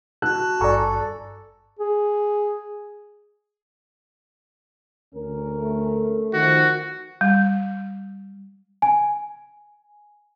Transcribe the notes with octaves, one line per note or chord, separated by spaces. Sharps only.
F#4 A5 F#6
G#1 G2 A4 D5 G#5 A#5 C#6
G#4
D2 C#4 A#4
A3
D#3 F3 F#4
G3
G#5